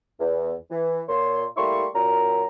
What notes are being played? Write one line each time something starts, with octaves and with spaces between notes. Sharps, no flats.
E2
E3
A#2 C#5 C6
G3 A3 A#3 E4 C6 C#6
F#2 A#2 A#5